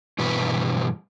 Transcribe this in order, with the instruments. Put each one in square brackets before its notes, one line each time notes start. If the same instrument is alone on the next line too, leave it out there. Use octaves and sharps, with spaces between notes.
[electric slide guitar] G2 B2 E3 B4